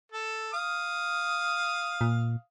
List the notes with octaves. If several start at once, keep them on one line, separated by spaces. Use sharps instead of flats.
A4
F5 D#6
A#2